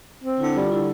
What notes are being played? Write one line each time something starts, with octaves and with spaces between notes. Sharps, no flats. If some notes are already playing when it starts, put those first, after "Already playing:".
C4
D3 E4
G3 F4
D3 E4